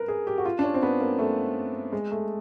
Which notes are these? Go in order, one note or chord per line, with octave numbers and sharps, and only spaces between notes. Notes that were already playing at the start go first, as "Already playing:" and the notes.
Already playing: A#4 B4
G#4
G4
F#4
F4
D4
C#4
C4
B3
A#3
A3
G#3
A3